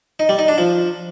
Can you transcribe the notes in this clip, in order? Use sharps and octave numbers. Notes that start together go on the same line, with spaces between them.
D#4
G3
D#4
D4
F3